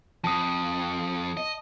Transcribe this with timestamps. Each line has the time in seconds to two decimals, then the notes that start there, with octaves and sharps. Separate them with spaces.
0.24 F2 A5 D#6
1.37 D#5